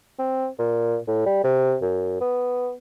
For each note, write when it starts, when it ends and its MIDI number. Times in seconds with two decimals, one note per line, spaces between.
0.19 0.47 60
0.59 0.97 46
1.08 1.23 45
1.26 1.40 55
1.44 1.76 48
1.82 2.21 42
2.21 2.73 59